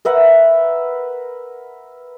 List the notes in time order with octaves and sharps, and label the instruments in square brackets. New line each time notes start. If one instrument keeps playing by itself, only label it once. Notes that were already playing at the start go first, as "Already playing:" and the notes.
[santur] A#4 B4 E5 F#5